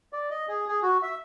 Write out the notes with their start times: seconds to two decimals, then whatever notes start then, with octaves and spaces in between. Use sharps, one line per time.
0.13 D5
0.30 D#5
0.49 G#4
0.68 G#4
0.83 F#4
1.03 E5